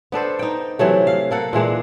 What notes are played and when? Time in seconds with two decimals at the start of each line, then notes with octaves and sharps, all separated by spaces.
0.12 B3 D4 A4 C5
0.39 D#4 G5
0.79 C3 E3 F#3 A3
1.07 F5
1.31 A#3 A4 F#5
1.53 A#2 E3 G#3 D4